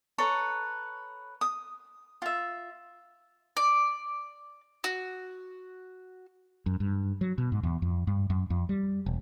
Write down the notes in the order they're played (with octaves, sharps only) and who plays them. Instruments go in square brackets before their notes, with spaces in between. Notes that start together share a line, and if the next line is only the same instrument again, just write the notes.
[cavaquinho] A4 B4 C#5 A#5
D#6
F4 E5
[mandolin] D5
F#4
[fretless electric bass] F#2
G2
F#3
B2
G#2
E2
F2
G2
F#2
F2
G3
E1